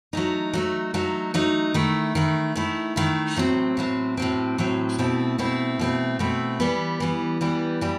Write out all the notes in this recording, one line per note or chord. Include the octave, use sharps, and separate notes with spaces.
F#3 A3 D#4
F#3 A3 D#4
F#3 A3 D#4
F#3 A3 D#4
D#3 A3 E4
D#3 A3 E4
D#3 A3 E4
D#3 A3 E4
A2 F#3 C4
A2 F#3 C4
A2 F#3 C4
A2 F#3 C4
B2 A3 C4 E4
B2 A3 C4 E4
B2 A3 C4 E4
B2 A3 C4 E4
E3 G3 B3
E3 G3 B3
E3 G3 B3
E3 G3